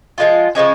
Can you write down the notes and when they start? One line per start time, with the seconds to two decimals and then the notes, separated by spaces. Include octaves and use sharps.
0.18 F3 G#3 F4
0.55 C#3 F3 G#3 C#4